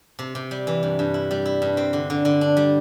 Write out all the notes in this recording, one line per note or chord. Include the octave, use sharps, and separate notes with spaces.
C3
C3
G3
E3
G2
G2
E4
G3
E4
G2
C4
D3
D3
D3
D4
G3